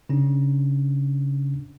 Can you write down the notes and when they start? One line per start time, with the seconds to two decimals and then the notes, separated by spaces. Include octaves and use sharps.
0.09 C#3 C#4 D4